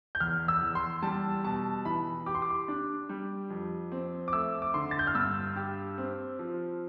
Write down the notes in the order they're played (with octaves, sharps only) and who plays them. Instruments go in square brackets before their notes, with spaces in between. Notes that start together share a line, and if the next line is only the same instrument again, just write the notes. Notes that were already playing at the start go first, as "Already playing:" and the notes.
[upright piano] G6
[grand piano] E2 [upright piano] F6
[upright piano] E6
[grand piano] E2
[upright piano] C6
[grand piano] G3 [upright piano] A5
[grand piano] B2 [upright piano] A5
[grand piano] E3 [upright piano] B5
[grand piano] G4 [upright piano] D6
[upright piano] C6
D6
[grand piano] D4
G3
F2
C4
[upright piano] D6
[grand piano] A3 [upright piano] E6
[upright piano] D6
[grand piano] D3 [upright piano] C6
[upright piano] A6
G6
F6
[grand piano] G2 [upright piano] E6
[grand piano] G4
C4
F3